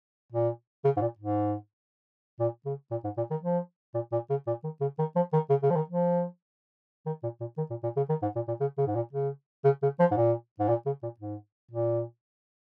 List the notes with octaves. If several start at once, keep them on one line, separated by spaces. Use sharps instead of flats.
A#2
C#3
G#2
A#2
G#2
A#2
C#3
A#2
G#2
A#2
D#3
F3
A#2
A#2
C#3
A#2
D#3
C#3
D#3
F3
D#3
C#3
C#3
F3
D#3
F3
D#3
A#2
A#2
D#3
A#2
A#2
C#3
D#3
G#2
A#2
A#2
C#3
C#3
G#2
A#2
C#3
C#3
C#3
F3
G#2
A#2
G#2
A#2
C#3
A#2
G#2
A#2